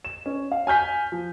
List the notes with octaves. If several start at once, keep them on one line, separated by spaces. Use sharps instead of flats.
E7
C#4
F5
G#5 F6 G6 B6
F3